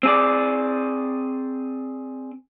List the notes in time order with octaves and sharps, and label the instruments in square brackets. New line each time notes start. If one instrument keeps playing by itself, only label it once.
[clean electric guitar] C4 G#4 D5